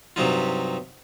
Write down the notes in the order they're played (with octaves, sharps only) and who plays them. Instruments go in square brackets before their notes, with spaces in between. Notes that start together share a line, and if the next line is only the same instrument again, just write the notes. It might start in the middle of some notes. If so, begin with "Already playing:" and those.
[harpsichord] G2 C3 F#3 D#4 F4